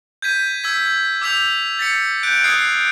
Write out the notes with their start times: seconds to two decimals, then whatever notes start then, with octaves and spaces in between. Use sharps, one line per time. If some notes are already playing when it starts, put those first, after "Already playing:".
0.22 G6 G#6 B6 D#7
0.64 E6 G#6 B6
1.22 D6 E6 G6 B6 F7
1.79 A6 B6 C#7
2.23 F#6 G6 D7
2.44 D#6 F6 F#6 G#6 C7